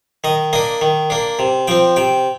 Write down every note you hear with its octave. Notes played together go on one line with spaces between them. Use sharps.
D#3 D#5
A#3 D4 D#5
D#3
A#3 D4
C3
F3 C4 G5
C3 G5